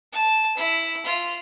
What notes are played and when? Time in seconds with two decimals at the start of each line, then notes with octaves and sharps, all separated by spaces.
0.13 A5
0.57 E4
1.05 F4